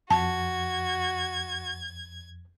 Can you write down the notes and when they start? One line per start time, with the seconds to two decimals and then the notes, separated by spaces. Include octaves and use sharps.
0.11 F2 F#4 A5 G#6